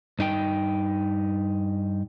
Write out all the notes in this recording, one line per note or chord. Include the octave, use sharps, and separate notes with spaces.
G2 D#4 G#4 G5